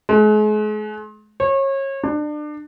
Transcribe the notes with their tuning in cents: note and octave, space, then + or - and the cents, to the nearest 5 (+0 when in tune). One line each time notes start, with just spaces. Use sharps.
G#3 +40
C#5 -30
D4 +30